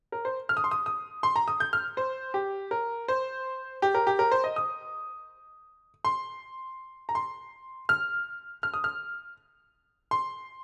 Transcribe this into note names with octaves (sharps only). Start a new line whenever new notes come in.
A#4
C5
F6
D#6
C6
D#6
D#6
C6
A#5
D#6
G6
F6
C5
G4
A#4
C5
G4
A#4
G4
A#4
C5
D#5
D#6
C6
A#5
C6
F6
F6
D#6
F6
C6